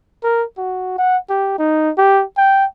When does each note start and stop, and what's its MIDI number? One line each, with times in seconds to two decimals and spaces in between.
0.23 0.44 70
0.58 0.96 66
0.98 1.17 78
1.30 1.54 67
1.58 1.91 63
1.98 2.23 67
2.37 2.65 79